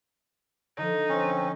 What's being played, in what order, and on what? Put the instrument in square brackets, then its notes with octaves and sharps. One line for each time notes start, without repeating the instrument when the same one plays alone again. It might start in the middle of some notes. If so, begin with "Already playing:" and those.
[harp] D3 F3 [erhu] D#4
[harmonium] C4 [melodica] C#4